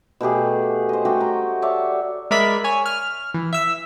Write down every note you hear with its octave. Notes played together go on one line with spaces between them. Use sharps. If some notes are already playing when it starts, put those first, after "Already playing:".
B2 A3 G4 G#4
C5 D#5
A3 F#4 G4 G5
A#5
C#5 D5 E5 A5
G#3 A#4 D5 E5 B5 B6
C#5 G#5
F6
E3
E5 E6